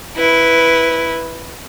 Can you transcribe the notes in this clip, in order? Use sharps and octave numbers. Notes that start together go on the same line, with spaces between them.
E4 B4